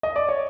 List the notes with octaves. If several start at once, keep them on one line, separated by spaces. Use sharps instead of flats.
D#5
D5
C#5